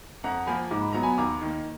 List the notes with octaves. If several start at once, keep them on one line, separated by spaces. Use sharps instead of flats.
F2 F#5 A#5
F3 A#3 G#5 B5
G#2 D6
B5
F#3 B3 A#5
G#5 B5
D#2 A#5 D6
D#3 A#3